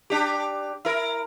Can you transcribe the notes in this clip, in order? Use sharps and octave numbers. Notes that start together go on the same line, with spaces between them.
D4 G4
E4 A#4